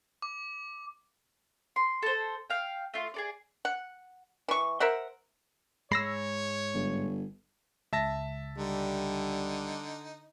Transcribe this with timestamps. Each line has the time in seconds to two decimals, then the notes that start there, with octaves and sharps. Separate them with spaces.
0.22 D6
1.76 C6
2.02 A4 C5
2.50 F5 G5
2.94 A3 F4
3.14 G#4 A4 D5
3.65 F#5
4.48 E3 C#6
4.80 A#4 C5 E5 F#5
5.92 G#2 G#3 C#5 B5 E6 A#6 C7
6.74 G1
7.93 C#2 E5 A5 A#6
8.58 D3 G3 D#4